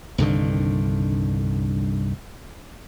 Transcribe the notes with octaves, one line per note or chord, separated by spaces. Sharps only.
C2 G2 D3 D#3